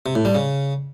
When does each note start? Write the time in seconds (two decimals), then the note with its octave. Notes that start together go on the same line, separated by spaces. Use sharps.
0.06 C3
0.15 A2
0.25 G3
0.35 C#3